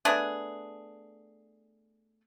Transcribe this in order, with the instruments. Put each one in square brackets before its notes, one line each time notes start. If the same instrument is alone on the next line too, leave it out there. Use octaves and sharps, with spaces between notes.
[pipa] A3 B3 D4 G#4